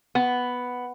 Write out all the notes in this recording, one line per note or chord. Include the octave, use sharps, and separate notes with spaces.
B3